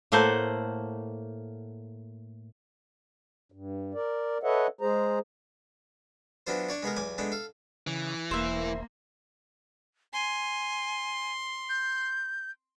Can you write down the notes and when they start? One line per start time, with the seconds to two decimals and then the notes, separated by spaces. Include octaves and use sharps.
0.12 A2 A3 A#3 C5 F#5
3.52 G2
3.94 A#4 D5
4.43 A4 B4 C#5 D#5 E5 F#5
4.81 G#3 G#4 C5 A#5
6.47 E3 F#3 B3 D4 F4 C5
6.69 D4 C#5 D5
6.83 G#3 B3 G#4 A#4
6.96 B1 E2 G#5 D6
7.18 G#3 A3 B3 D4
7.32 A4 F5
7.87 C#3 E3
8.31 E1 A#3 C5 E5
10.13 G#5 C6
11.69 G6